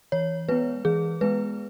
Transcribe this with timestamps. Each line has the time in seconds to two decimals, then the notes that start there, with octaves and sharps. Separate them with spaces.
0.12 E3 C#5
0.49 G#3 B3 B4
0.85 E3 G#4
1.21 G#3 B3 B4